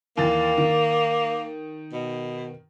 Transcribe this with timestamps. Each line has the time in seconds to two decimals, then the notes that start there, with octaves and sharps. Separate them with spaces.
0.17 D#2 E3 A#3 A6
0.58 D#3
1.93 B2